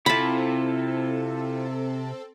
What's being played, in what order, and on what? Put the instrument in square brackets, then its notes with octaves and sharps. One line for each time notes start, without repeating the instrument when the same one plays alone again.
[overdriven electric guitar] C3 [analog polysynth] C4 A4 [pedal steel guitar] E4 F4 [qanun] A5 B5